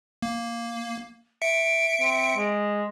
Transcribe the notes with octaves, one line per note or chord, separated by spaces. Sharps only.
A#3
E5 C#7 D7
C4
G#3